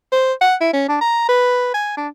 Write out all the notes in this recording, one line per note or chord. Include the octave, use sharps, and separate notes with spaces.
C5
F#5
E4
C#4
D4
A#5
B4
G#5
D4